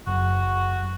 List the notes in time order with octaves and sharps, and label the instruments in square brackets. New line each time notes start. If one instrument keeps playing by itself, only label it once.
[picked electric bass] F#1 F#2 [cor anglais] F#4